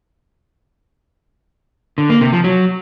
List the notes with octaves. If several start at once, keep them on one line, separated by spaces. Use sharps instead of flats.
D3
A#3
C3
F3
F#3